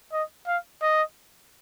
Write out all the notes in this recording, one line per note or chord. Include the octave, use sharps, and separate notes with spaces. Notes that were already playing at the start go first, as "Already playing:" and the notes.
D#5
F5
D#5